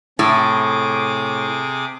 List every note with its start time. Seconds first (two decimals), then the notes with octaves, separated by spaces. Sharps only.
0.19 A2 C3 G#4 D6